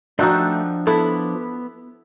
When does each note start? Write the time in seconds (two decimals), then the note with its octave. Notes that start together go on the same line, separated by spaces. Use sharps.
0.19 F3 A3 D4 D#4 F#4 G5 E6
0.87 B3 E4 A4